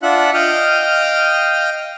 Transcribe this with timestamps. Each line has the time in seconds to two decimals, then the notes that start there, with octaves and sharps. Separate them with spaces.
0.03 D4 F4 E5 F#5 F#6
0.34 D#5 F5 G5 D#6 F6